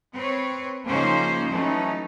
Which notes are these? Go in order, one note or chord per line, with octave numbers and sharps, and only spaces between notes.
C4 B4 C#5
C#3 F3 A#3 C#4 D#4 C5
E3 F#3 A3 C#4 D#4